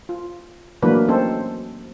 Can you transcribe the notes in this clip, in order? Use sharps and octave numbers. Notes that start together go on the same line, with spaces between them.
F4
E3 F#3 A3 A#3 D4 B4
C4 C#4 D#4 A4 C5